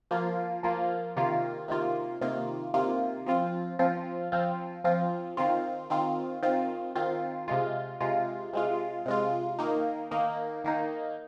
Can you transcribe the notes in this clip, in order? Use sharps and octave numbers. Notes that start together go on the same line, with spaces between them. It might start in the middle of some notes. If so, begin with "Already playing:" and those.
F3 A#3 F4
F3 A#3 F4
C3 D#3 A#3 F4
C3 D#3 A#3 F4
C3 D#3 A#3 F4
C3 D#3 A#3 F4
F3 C4 F4
F3 C4 F4
F3 C4 F4
F3 C4 F4
D#3 C4 F4
D#3 C4 F4
D#3 C4 F4
D#3 C4 F4
C3 G#3 F4
C3 G#3 F4
C3 G#3 F4
C3 G#3 F4
D#3 A#3 D#4
D#3 A#3 D#4
D#3 A#3 D#4